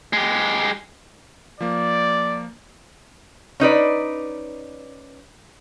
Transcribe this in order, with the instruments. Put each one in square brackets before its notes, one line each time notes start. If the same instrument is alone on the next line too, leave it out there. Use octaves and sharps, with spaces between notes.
[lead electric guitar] G#3 G4
[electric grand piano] F3 A#3 [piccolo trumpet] D5
[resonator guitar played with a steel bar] C#4 D#4 B4 D5